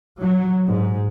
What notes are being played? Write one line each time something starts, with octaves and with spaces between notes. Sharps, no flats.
F#3
G#2